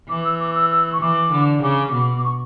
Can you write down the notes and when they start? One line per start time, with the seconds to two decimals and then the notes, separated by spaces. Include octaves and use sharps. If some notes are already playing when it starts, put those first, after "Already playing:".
0.09 E3 D6
0.24 E6
0.40 D6
0.55 E6
0.71 E6
0.93 C#6
1.01 E3 D6
1.31 D3
1.63 C#3 D6
1.93 B2
2.18 D6
2.24 C#6